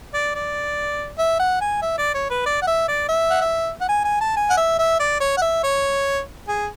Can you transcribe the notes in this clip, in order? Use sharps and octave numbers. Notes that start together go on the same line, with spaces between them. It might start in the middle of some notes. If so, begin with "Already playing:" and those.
D5
D5
E5
F#5
G#5
E5
D5
C#5
B4
D5
F#5
E5
D5
E5
F#5
E5
F#5
G#5
G#5
A5
G#5
F#5
E5
E5
D5
C#5
F#5
E5
C#5
G#4